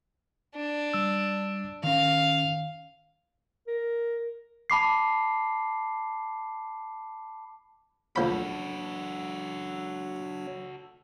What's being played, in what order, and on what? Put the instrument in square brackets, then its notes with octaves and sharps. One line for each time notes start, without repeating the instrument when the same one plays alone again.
[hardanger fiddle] D4
[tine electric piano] G3 E6
[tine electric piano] D#3 C#4 [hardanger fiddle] F5
[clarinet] A#4
[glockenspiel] A5 B5 D6 C7
[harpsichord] D2 F3 B5 [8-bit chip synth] F#3 D4 C#5 [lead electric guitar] F#4 A4